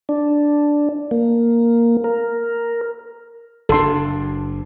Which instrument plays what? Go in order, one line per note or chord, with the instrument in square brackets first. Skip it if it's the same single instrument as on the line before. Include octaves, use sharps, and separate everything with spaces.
[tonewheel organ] D4
A#3
A#4
[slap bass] F#1 D4 [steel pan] A4 C6